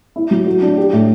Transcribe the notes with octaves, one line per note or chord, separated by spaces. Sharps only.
E4
F#3
F#4
D4
G4
A2